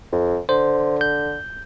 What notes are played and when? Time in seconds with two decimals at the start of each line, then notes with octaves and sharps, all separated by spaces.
0.12 F2
0.49 D3 C5
1.01 G6